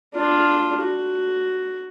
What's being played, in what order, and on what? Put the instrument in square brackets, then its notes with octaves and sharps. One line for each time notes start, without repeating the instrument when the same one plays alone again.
[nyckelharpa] D4 F4
F#4